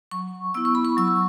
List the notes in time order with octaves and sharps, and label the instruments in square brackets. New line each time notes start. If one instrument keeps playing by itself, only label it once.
[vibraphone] F#3 C#6
B3 E4 E6
C#6
B5
C#6
F#3 E6